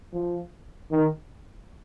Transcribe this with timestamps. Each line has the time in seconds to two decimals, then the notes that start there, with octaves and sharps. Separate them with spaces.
0.13 F3
0.92 D#3